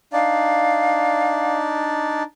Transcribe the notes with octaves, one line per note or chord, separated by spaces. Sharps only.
D4 D#4 D5 F5